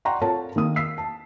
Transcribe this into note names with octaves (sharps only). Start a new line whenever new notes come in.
D5 F#5 G5 A#5 C6 C#6
C4 F4 A4 A#4 C#5 A5
D#3 A#3 D#6
E6 B6 C7
A5